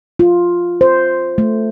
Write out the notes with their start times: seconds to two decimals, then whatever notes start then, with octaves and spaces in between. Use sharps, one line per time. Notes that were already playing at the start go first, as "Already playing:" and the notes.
0.19 F4
0.81 C5
1.38 A3